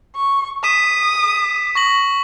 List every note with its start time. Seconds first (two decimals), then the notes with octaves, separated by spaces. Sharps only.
0.16 C#6
0.64 D#6 B6 D#7 E7
1.75 C#6 A#6 F#7